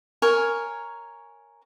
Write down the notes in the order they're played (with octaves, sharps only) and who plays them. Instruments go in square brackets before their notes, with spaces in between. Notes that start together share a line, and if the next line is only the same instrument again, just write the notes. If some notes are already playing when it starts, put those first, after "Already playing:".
[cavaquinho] A#4 C#5 G#5